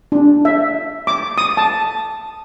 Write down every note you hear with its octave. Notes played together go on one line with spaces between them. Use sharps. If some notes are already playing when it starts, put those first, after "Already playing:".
D4
E5
D6
D#6
A5